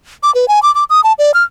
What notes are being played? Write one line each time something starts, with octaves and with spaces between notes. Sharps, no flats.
D6
B4
G#5
D6
D6
D#6
A5
D5
F6